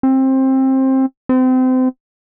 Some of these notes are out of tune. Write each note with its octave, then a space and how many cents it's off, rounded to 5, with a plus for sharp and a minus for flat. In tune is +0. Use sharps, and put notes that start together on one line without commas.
C4 +20
C4 -30